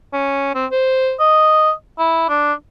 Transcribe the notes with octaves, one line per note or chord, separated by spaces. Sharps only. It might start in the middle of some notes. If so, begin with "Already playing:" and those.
C#4
C4
C5
D#5
E4
D4